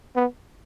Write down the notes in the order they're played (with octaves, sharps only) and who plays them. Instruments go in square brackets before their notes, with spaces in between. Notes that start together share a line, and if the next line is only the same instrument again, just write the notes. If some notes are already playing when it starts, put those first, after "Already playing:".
[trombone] B3